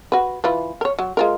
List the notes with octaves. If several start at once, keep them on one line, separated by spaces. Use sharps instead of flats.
F#4 B4
E3 F4 B4
A#4 C#5
F#3
G#3 F4 A#4